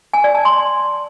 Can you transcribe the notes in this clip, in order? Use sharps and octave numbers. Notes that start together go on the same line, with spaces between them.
G#5
D5
A5
C6